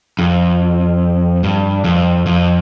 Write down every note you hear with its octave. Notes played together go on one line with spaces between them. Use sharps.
F2
G2
F2
F2